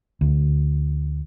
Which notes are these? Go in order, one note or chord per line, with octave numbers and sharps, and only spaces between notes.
D2